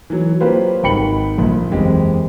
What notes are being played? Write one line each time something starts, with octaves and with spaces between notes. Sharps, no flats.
E3 F#3
F#3 A#3 F4 G4 B4 C5
G#1 D#3 G5 B5 C#7 F#7
A#1 A#2
F#1 E2 G#3 C4 G4